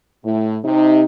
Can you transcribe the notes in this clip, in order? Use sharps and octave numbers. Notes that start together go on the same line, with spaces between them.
A2
C3 D#4